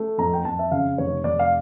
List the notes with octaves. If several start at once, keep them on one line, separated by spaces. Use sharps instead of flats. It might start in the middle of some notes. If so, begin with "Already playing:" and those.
Already playing: A3
F2 A#5
G5
F2 A5
E5
C#3 F5
F1 C#5
F1 D5
F5